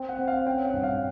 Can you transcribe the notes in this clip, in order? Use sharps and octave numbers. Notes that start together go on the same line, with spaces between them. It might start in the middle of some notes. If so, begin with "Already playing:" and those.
Already playing: C4 G5
F#5
C4
F5
C#4 G5
F#5
G2
F5